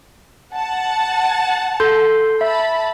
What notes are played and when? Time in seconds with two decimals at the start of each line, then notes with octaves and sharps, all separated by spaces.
0.54 F#5 A5
1.80 A4 C6 G6
2.41 E5 A5 B5